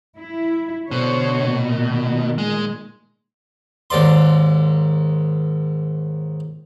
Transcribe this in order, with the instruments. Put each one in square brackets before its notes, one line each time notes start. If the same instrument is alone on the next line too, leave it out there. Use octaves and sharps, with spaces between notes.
[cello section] E4
[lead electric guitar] B2 [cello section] D3 C5 C#5
[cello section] A#2 D#3
[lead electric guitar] G#3
[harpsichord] D#2 G#2 D5 C6